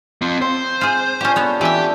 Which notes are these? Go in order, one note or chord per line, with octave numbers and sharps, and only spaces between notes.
C4 F4
C4 A#4 C5
F4 G#4
C#4 D4 F4 G4 C#5
B3 A4 C#5
E3 F4 G4 D5 E5